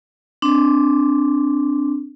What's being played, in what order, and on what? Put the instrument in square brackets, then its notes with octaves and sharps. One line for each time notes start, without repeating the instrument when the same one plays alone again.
[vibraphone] C4 D4